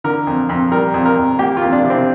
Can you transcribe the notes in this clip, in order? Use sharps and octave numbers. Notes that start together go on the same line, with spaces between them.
D3 A#4
F2
F2
G3 A#4
F2
A#4
F2
A#3 G4
F4
F2
D4
C3
C4